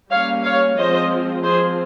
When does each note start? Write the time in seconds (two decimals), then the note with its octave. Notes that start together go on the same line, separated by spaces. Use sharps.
0.11 G3 A#3 C#4 C#5 F5
0.44 C#5 F5
0.77 F3 G#3 C4 C5 D#5
1.43 F3 C4 G#4 C5